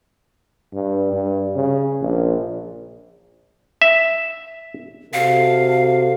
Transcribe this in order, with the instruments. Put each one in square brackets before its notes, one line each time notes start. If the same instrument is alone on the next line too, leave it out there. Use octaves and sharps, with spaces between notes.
[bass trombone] G2
G2
C#3
A#1
[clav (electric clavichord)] E5
[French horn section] C3 F#4 A4 [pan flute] F5